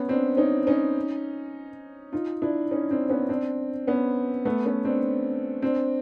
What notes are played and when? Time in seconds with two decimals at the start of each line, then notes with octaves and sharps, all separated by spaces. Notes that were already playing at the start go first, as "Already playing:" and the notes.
Already playing: B3 C#4
0.09 C4 D4
0.37 C#4 D#4
0.67 C#4 D#4
2.13 D#4 F4
2.42 D4 E4
2.71 C#4 D#4
2.91 C4 D4
3.10 B3 C#4
3.29 C4 D4
3.87 B3 C#4
4.45 A3 B3
4.65 B3 C#4
4.85 C4 D4
5.62 C4 D4